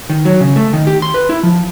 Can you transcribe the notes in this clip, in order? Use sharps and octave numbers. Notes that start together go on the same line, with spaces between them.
D#3
F#3
C#3
A3
D#3
G4
C6
B4
E4
F3